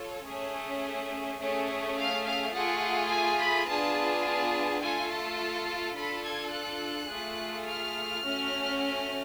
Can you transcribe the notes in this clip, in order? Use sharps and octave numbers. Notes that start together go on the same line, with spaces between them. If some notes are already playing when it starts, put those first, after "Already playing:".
Already playing: F4 A4 C#5
A3 C#4 G#4
A3 C#4 G#4 C#5
F5
F5
A3 F4 G#4 F#5
G#5
B5
B3 D4 F4 G#4 A5
A5
A3 F4 A4 G#5
A5
D4 F4 A4 B5
G#6
F#6
A3 F4 G#4
F6
A3 C#4 F#4